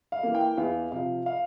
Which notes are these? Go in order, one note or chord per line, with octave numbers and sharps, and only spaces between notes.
F5
E3 A#3
G5
E2 F5
C3 F3 F5
F5